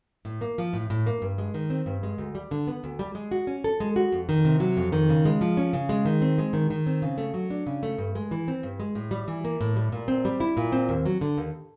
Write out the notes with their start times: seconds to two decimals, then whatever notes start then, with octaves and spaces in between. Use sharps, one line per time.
0.25 A2
0.41 A#3
0.58 F3
0.73 A2
0.90 A2
1.06 A#3
1.22 G2
1.38 G#3
1.54 D#3
1.70 C4
1.86 G2
2.03 G#3
2.18 D2
2.35 G3
2.51 D3
2.67 B3
2.84 D2
2.99 G3
3.15 G#3
3.31 F#4
3.47 C#4
3.64 A4
3.80 G#3
3.96 F#4
4.12 F2
4.29 D#3
4.45 C3
4.60 F#3
4.77 F2
4.92 D#3
5.09 C#3
5.25 G#3
5.41 F3
5.57 C#4
5.73 C#3
5.89 G#3
6.05 D#3
6.22 C4
6.38 G#3
6.53 D#3
6.70 D#3
6.87 C4
7.02 C#3
7.18 A3
7.34 F#3
7.50 D4
7.67 C#3
7.83 A3
7.98 G2
8.15 G#3
8.31 E3
8.48 C4
8.63 G2
8.80 G#3
8.95 A2
9.11 G3
9.28 E3
9.44 A#3
9.61 A2
9.76 G3
9.92 A#2
10.08 C4
10.25 G3
10.40 E4
10.57 A#2
10.72 C4
10.89 D#2
11.06 F#3
11.21 D3
11.37 D#2